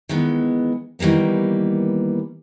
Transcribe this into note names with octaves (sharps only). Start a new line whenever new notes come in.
D#3 E3 G#3 B3
D#3 E3 G3 A#3 B3